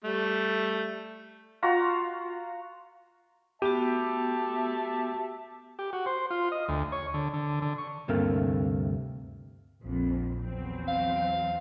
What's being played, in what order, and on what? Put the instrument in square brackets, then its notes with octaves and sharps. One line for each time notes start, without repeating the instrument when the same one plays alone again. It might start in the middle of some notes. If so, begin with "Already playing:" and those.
[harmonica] G3 A3
[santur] F4 F#4 A#5
[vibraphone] B3 F#4 [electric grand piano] G4 [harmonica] E5 A5
[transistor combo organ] G4
F#4
C5
F4
D#5
D2
C#5
D3
D3
D3
C#6
[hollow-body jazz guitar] D2 G2 C3 A3 A#3
[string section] A#1 F2
E2 F#3 C4
[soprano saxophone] F5